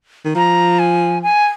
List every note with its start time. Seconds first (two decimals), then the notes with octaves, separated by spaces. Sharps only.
0.25 D#3
0.35 F3 A#5
0.79 G#5
1.23 G#5